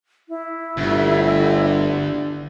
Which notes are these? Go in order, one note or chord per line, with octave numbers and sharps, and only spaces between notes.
E4
G1 D2